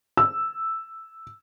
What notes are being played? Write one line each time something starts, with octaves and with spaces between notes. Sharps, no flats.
E6